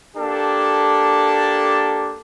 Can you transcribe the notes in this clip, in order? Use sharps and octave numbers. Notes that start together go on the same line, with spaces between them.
A#3 D4 G4 A4